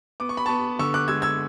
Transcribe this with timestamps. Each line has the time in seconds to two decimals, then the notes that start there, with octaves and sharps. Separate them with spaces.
0.20 B3 D6
0.29 C#6
0.37 B5
0.46 B3 A5 C#6
0.79 D3 C#6 E6
0.94 D6 F#6
1.08 G#3 E6 G#6
1.22 E6 G#6